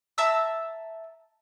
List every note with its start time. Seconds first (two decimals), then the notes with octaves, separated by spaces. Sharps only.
0.18 E5 A5 A#5 E6